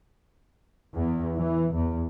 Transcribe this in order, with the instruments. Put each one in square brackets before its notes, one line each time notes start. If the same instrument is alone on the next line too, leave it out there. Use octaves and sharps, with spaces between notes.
[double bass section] E2
E3
E2